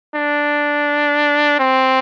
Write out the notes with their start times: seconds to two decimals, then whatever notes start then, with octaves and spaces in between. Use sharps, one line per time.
0.15 D4
1.59 C4